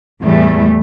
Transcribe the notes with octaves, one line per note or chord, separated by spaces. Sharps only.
E2 A2 G3 A3